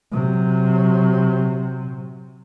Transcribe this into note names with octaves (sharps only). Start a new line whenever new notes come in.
C3 F#3